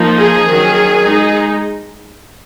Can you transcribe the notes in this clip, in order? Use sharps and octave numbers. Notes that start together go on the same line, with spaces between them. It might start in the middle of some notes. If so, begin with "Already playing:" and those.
Already playing: F3 A#3 D#4
G#4
D#3 F#3 C#4
G#3 D#4